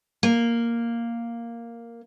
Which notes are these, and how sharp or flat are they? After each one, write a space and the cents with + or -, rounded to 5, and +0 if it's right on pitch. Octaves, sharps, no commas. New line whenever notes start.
A#3 +0